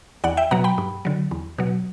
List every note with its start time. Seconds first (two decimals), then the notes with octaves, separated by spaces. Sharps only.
0.24 E2 D5 F#5
0.37 E5 G5
0.51 B2 F#3 F#5 A#5
0.64 G5 B5
0.78 G2
1.05 D3 F#3
1.31 E2
1.58 B2 F#3